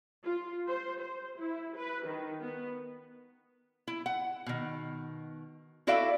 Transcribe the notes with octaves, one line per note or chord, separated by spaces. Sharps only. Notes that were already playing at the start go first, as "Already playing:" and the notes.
F4
C5
C5
E4
B4
D#3
B3
E4
F#5
B2 D#3
E4 F#4 A4 D5 E5 F5